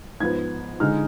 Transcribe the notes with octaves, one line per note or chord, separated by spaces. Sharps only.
G#2 F3 B3 G#6
D3 G#3 D#4 F6